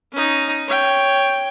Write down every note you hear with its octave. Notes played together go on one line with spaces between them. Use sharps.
C#4 D#4
C#5 G5